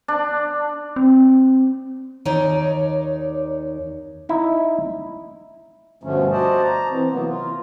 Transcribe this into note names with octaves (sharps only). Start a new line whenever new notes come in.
D4
C4
D#2 D#4 C#5 D5
D#4 E4
G2 B2 D3 F3 A3 C#4
F#4 C5 D5 D#5 A5
A#5
E3 C4
C3 E3 F#3 A#3 B3
F4